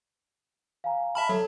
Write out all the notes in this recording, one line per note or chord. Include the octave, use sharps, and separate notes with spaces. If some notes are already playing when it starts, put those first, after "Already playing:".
F5 G#5 A#5
E5 A5 B5 F6
F#3 A4